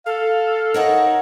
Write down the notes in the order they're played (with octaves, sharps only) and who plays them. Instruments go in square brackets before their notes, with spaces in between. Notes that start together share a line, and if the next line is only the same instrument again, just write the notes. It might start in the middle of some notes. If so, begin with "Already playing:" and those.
[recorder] A4 [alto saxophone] F5
[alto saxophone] D#4 [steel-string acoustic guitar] A#4 C#5 F#5